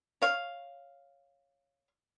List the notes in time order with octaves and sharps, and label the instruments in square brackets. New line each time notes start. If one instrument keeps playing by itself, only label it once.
[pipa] C#5 F5